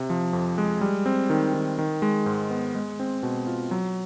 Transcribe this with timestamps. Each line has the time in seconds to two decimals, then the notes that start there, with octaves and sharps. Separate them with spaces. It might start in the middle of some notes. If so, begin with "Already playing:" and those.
Already playing: C3
0.10 F3
0.33 F2
0.58 G#3
0.81 G3
1.06 C4
1.30 D#3
1.54 D#3
1.79 D#3
2.02 G#3
2.26 G#2
2.50 B3
2.75 G#3
3.00 C4
3.23 B2
3.47 F4
3.71 F#3